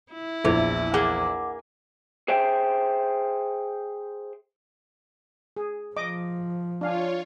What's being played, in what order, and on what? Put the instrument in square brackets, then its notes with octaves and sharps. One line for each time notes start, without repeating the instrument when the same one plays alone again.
[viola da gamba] E4
[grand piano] A#1 E2 [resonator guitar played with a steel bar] E3
[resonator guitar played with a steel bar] A#3 G#4 [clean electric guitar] D5 F#5
[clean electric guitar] G#4 C5 E5 G5
[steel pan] G#4
[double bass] F3 [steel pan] D#5 D6
[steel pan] D4 F5 G#5 [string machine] F4 C#5